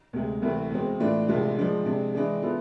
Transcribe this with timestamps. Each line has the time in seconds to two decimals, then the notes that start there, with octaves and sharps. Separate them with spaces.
0.13 D2 C3 G#3
0.42 C2 C3 E3 A3
0.71 E2 B2 G#3 C4
1.00 A2 E3 A3 D4 F4
1.28 C2 C3 G#3 D4 F4
1.57 F3 G#3 D4
1.85 C3 G#3 D4
2.14 E3 G#3 D4 G#4
2.42 E3 B3 F4 A4